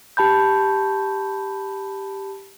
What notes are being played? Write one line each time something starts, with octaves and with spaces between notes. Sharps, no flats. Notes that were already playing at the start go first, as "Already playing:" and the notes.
G4 A5 B5 G6